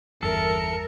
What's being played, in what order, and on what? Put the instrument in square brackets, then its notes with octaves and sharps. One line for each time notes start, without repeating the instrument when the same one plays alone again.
[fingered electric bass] G1 E2 G2 [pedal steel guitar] A4 [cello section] A#4 [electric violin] E5 C#7